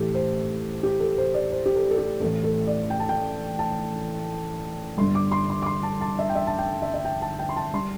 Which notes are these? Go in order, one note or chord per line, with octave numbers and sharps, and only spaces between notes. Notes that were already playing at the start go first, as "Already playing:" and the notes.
Already playing: A1 A2 E3 G4 A4
C5
G4
A4
C5
D5
C5
G4
A4
A4
G4
A1 A2 A3 A4
A4
D5
G5
A5
G5
A5
G1 G2 D3 G3 C6
D6
C6
C6
D6
C6
A5
A5
E5
G5
E5
A5
G5
E5
E5
G5
A5
G5
C6
A5
G3 C6